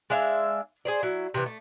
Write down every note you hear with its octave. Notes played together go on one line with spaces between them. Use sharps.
G#3 D4 E5 F5
G#4 C5 D5
F#3 E4
C3 E3
A3